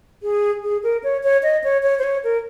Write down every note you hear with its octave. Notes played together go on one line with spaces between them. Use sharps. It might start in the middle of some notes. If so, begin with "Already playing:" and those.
G#4
G#4
A#4
C#5
C#5
D#5
C#5
C#5
C5
C#5
A#4